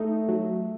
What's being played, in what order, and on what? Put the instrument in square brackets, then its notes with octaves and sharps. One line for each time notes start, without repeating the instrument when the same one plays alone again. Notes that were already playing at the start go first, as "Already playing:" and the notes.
Already playing: [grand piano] A3 [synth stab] D#4
[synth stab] F#3